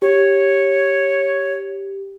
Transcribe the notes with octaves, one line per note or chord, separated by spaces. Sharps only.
G4 C#5